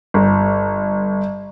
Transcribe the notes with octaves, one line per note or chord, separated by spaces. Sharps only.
G1